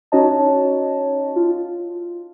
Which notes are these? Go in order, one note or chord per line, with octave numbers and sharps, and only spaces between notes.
C#4 D#4 F#4 C#5 D#5 A5
F4